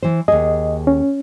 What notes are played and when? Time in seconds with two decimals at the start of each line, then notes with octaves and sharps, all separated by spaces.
0.03 E3 C5
0.28 D#2 G#4 D#5
0.87 C#4